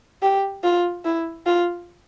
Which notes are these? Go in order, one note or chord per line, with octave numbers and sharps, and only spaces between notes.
G4
F4
E4
F4